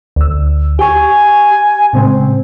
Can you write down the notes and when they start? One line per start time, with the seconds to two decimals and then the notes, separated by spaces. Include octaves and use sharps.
0.16 D2 E6
0.79 G4 G#5 C#6
1.93 A2 C#3 G#3 C4